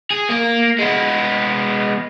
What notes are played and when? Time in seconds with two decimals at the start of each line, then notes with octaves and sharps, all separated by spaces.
0.11 G#4
0.29 A#3
0.79 G#3 B3